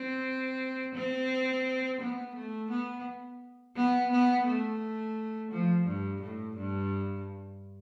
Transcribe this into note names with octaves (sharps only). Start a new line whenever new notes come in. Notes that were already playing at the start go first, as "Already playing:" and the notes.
Already playing: C4
C4
B3
A3
B3
B3
B3
A3
F3
G2
A2
G2